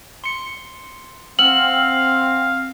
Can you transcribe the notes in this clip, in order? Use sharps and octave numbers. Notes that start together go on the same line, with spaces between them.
C6 C#7
C4 F5 F#5 E6 F6 F#7